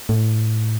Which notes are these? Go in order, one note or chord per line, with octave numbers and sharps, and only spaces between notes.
A2